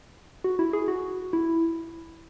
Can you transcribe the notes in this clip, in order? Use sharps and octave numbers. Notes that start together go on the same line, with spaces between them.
F#4
E4
G#4
F#4
E4